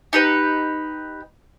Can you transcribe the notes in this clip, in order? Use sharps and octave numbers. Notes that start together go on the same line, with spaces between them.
D#4 G4 B4